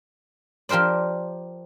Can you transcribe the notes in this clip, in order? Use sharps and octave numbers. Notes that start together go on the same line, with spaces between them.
F3 G4 A#4 C5 D5